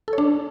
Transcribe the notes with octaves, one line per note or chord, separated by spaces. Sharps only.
A4
C#5
D4